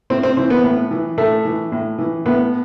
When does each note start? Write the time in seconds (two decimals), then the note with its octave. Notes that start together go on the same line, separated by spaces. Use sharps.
0.10 A2 C4
0.23 C4
0.37 E3 C4
0.50 B3
0.64 A2
0.91 E3
1.18 A2 A3
1.45 E3
1.72 A2
1.98 E3
2.25 A2 B3